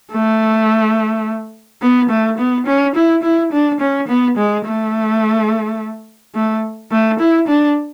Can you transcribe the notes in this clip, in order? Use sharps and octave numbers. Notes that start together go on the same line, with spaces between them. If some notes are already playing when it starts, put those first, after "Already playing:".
A3
B3
A3
B3
C#4
E4
E4
D4
C#4
B3
G#3
A3
A3
A3
E4
D4